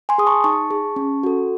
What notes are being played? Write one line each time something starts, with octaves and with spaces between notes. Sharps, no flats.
G#5 C6
G#4 D#6
A5 C#6
D#4 A5 C#6
G#4
C#4
F#4 A4